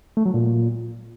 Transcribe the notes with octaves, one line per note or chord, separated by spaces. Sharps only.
A3
F#3
A#2